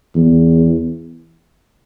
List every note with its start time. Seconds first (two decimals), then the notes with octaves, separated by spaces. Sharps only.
0.15 E2